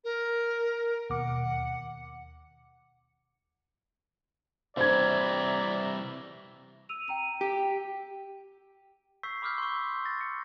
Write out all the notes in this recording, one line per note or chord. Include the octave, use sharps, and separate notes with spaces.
A#4
D#2 B2 F#5 D6
C3 E3 G3 C5 D5 E5 A#5 G#6
E6 D#7 F7
G5 A#5 D#7
G4
C#6 E6 G6 B6 C7
B5 D6 E6 F6 G6 B6
C6 C#6
E6 G6
A6 A#6
C#7